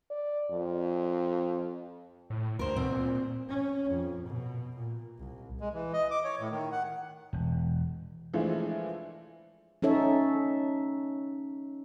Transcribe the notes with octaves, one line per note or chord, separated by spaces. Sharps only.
D5
F2
A2
D2 A#4 C5
B2 C4
A#2
C#4
F2
B2
A#2
C2
G#3
E3
D#5
D6
C#5
A2
D#3
F#5
E1
E3 F3 G#3 A3 D4 E4
C#4 D#4 A4 C#5 E5